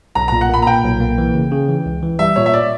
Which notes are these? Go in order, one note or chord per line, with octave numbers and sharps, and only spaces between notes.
B1 A#5
A#2 A#5
F#5
A#3 B5
A#5
A#2 G5
B1
A#3
E3
C#3
C#3
E3
C#2
E3
G3 E5
A#2 C#5
E5
D5